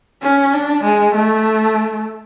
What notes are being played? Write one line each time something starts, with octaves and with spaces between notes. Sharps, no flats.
C#4
D4
G#3
A3